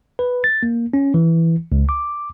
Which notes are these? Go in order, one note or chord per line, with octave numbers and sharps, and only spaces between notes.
B4
A6
A#3
C#4
E3
C#2
D6